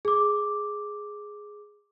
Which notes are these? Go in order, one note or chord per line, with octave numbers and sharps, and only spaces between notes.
G#4 D6